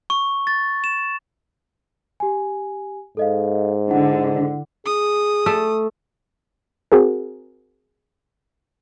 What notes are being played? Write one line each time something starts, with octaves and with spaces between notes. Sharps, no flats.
C#6
A6
E7
G4 G#5
G#2 A4 D#5 F5
D3 E4 F#5
G#4 D#6
A3
C4 F#4 G#4 A#4